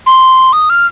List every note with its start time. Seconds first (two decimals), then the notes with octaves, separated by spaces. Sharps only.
0.06 C6
0.53 D#6
0.70 F6